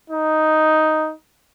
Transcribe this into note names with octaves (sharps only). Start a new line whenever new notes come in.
D#4